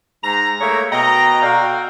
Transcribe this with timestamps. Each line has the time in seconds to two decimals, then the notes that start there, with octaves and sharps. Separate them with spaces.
0.24 G#2 A#5
0.60 A3 A#3 G#4 C#5 E5
0.91 B2 D#5 G5 A#5
1.42 F#4 A4 D5 F5 G5